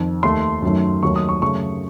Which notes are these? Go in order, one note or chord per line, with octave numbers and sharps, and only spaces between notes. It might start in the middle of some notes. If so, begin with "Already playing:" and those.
Already playing: F2 D#3
D#2 D#3 A3 C6
F#2 D#3 F#3 A3
D#2 D#3 F#3 A3 C#6
D#6
C#6
F#2 C#3 F#3 A3 C#6